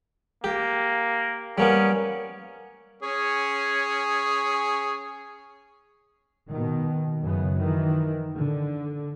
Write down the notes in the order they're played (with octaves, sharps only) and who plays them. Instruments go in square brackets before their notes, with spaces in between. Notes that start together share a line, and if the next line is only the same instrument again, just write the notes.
[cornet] A#3 [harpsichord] G4
[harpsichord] G3 A#3 B3 [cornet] C#4
[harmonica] C#4 G#4 C#5
[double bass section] B2 D#3
F#2 C#3 B3
D#3 E3
D3